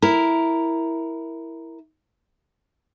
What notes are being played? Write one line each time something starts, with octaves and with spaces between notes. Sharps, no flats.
E4 A#4